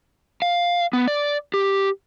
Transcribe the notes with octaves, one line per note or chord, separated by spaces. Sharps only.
F5
B3
D5
G4